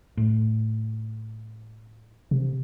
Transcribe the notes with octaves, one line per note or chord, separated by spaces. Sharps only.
A2
C3